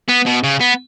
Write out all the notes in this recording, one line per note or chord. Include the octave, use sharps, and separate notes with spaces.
B3
B2
C#3
B3